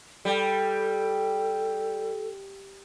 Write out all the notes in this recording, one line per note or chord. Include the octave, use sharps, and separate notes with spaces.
G3 A4